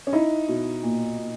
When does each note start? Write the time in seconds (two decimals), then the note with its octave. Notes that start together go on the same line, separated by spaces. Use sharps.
0.07 C#4
0.13 D#4 E4
0.48 B2
0.83 A#2
1.18 A#2